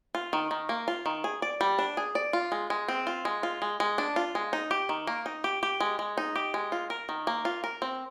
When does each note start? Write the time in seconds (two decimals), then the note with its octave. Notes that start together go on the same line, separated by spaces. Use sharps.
0.15 F4
0.33 D#3
0.51 D#3
0.69 A#3
0.88 F4
1.06 D#3
1.24 G#4
1.42 D5
1.61 G3
1.79 D4
1.97 G#4
2.15 D5
2.33 F4
2.52 G#3
2.70 G#3
2.88 C4
3.07 F4
3.25 G#3
3.43 F4
3.62 G#3
3.80 G#3
3.98 D4
4.16 F4
4.35 G#3
4.53 D#4
4.71 G4
4.89 D#3
5.07 A#3
5.26 D#4
5.44 G4
5.63 G4
5.80 G#3
5.99 G#3
6.18 D#4
6.36 G4
6.54 G#3
6.72 F4
6.90 A#4
7.09 D#3
7.27 A#3
7.45 F4
7.64 A#4
7.82 C4